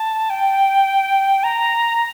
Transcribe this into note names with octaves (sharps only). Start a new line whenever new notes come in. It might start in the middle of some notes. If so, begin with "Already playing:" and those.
Already playing: A5
G5
A#5